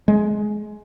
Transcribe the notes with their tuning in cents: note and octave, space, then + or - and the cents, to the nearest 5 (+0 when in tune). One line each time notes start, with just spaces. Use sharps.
G#3 +15